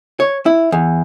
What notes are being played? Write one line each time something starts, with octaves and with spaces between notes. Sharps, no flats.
C#5
E4
E2